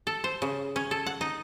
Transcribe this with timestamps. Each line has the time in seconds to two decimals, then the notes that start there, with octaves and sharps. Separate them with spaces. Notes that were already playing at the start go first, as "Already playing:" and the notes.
0.07 A4
0.24 C5
0.42 C#3
0.76 C#4
0.91 A4
1.06 F#5
1.21 D#4